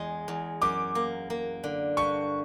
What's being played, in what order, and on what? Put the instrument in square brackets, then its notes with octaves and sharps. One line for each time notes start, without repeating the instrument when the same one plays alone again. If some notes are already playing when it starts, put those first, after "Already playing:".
Already playing: [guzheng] E2 G#3
E2
[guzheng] F#2 [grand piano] D6
[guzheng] A#3
A#3
D3
[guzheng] G2 [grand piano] C#6